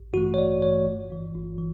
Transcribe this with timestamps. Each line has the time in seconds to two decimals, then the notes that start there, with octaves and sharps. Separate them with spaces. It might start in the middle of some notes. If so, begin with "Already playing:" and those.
Already playing: A1
0.13 G2 E3 A3 F#4
0.34 C#5
0.38 A1 D5
0.62 G2 E3 A3 C#5
0.86 G1
1.10 G2 E3
1.34 G1
1.58 E3